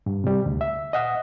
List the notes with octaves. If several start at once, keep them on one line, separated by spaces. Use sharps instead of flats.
G2
C3 G3
D2
E5
D#5 F#5 D#6